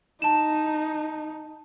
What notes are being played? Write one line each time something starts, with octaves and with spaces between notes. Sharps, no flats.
D#4 A5 E7